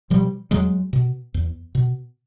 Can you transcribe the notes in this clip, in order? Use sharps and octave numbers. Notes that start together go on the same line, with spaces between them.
B2 F3 G3
E2 F#3 G#3
B2
E2
B2